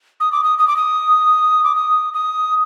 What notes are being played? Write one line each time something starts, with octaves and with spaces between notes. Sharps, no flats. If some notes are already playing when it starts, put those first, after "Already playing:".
D#6
D6
D#6
D#6
D6
D#6
D6
D#6
D#6